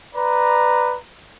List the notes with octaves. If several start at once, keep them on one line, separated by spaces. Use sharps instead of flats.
B4 D5 A#5